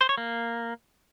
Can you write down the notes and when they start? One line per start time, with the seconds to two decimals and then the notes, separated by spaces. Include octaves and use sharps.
0.01 C5
0.09 C#5
0.18 A#3